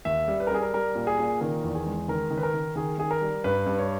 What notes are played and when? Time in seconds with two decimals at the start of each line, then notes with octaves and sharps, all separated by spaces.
0.05 D#2 E5
0.28 G3
0.40 B4
0.47 A#4
0.51 G3 G#4
0.63 A#4
0.74 G3 A#4
0.95 A#2
1.07 G#4
1.19 A#2
1.40 D#3 A#4
1.63 E2
1.75 G#4
1.86 G#3
2.08 D#3 A#4
2.31 D#3
2.37 B4
2.43 A#4
2.54 D#3
2.76 D#3 G#4
2.98 D#3 G#4
3.11 A#4
3.21 G3
3.44 G2 B4
3.66 G2
3.78 C#5